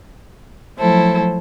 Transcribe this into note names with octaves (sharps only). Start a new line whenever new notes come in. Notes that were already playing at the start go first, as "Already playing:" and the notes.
F3 F#3 A3 E4 A4 C5